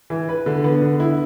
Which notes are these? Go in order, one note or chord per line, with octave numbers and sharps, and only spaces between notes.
E3
B4
D3
B3
D3
E4